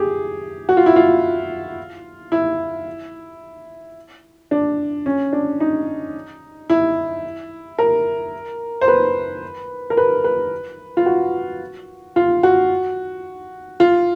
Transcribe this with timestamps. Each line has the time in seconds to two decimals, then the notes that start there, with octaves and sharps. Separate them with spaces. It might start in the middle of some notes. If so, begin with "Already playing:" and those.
Already playing: G4 G#4
0.69 F#4
0.77 F4
0.86 E4
0.96 F4
2.32 E4
4.51 D4
5.06 C#4
5.33 D4
5.60 D#4
6.70 E4
7.79 A#4
8.81 C5
8.88 B4
9.90 A#4
9.97 B4
10.24 B4
10.97 F4
11.06 F#4
12.16 F4
12.43 F#4
13.80 F4